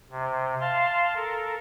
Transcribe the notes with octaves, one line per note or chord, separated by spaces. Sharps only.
C3
F5 A5 C6
A4 A#4